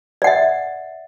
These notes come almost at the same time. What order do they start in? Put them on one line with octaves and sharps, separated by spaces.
D5 F#5 E5